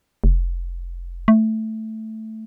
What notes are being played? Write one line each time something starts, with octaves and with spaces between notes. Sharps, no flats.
F1
A3